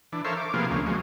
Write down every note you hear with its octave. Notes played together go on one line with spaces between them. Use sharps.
E3 D4
A4 A#4 C5 C#5 E5 F5
D6
C3 F3 A#3 B3 F4 G#4
D2 A#3 C#4
F3 F#3 G#3